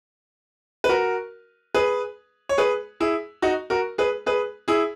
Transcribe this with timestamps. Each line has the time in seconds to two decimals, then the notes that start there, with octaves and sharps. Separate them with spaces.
0.84 B4
0.89 F#4 A#4
1.74 G#4 B4
2.49 C#5
2.58 G#4 B4
3.00 E4 G#4
3.42 D#4 F#4
3.70 F#4 A#4
3.98 G#4 B4
4.26 G#4 B4
4.68 E4 G#4